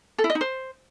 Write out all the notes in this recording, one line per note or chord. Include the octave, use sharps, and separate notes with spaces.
A4
E4
D#5
D#4
C5